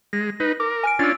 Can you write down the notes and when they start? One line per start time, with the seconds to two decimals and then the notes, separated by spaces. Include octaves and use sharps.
0.13 G#3 A#6
0.40 D#4 B4
0.60 A#4 D6
0.84 G#5 F6 D7
0.99 C#4 D4 F4 E6 A6